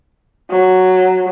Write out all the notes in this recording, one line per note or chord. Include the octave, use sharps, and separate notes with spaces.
F#3